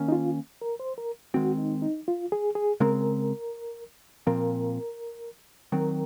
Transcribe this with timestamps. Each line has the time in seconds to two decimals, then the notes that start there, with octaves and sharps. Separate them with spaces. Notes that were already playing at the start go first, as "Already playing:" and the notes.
Already playing: D#3 A#3 C#4
0.08 D#4
0.12 F4
0.62 A#4
0.80 C5
0.98 A#4
1.34 D#3 G#3 C4 F#4
1.58 D#4
1.82 D#4
2.08 F4
2.32 G#4
2.55 G#4
2.80 C#3 G#3 C4 A#4
4.27 A#2 F3 C4 A#4
5.72 D#3 F#3 C4 A#4